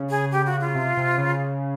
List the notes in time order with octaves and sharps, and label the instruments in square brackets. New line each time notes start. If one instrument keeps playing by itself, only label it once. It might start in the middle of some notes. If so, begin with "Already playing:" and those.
Already playing: [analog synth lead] C#3
[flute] G#4
G4
F#4
F4
[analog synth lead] C3
C3
C#3